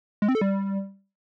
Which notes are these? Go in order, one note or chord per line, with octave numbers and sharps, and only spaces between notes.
G#3
C4
A4
G3